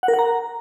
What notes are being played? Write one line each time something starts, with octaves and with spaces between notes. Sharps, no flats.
F#5
A#4
F#5
A#5